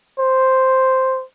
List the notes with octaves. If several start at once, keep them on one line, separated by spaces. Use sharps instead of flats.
C5